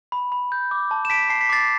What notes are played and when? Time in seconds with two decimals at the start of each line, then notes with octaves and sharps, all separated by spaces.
0.12 B5
0.32 B5
0.52 G6
0.71 D6
0.91 A5
1.05 E7
1.10 A5 B6 D7
1.30 A5 C7
1.41 B6
1.49 D6 A6 C7